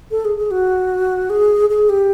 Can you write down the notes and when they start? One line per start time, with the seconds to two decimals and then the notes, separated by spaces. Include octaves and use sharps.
0.11 A4
0.25 G#4
0.37 G#4
0.51 F#4
1.30 G#4
1.70 G#4
1.89 G4